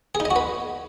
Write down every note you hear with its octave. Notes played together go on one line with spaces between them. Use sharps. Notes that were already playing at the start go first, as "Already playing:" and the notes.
G#4
D#4
D#5
F#4
B4